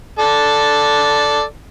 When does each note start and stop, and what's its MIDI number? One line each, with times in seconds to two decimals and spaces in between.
0.19 1.43 69
0.19 1.43 74